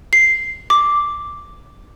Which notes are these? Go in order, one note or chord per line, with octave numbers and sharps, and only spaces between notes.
C7
D6